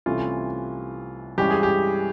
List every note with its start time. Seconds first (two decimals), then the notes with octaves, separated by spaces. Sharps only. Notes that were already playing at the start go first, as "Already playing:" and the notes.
0.06 C2 C3 E3 A3 C#4 F4
1.38 G2 E3 G#3 C#4 G4
1.51 G#4
1.63 G4